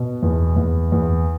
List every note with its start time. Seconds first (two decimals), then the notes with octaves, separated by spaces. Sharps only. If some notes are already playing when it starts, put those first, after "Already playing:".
Already playing: B2
0.22 E2
0.56 E2
0.92 E2